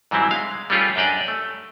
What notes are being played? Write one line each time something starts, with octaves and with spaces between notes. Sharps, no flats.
G#2 E3 F#3 G3 C4 E4
G#3 F5
G3 A3 C#4 F4 G4 G#4
F#2 D4 G4 D5 D#5
A3